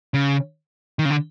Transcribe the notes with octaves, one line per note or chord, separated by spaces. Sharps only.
C#3
D#3
C#3
D3